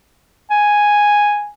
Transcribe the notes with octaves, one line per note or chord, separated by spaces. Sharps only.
G#5